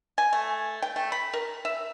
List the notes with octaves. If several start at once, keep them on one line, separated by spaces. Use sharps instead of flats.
G#5
A3
G5
A3
B5
A#4
E5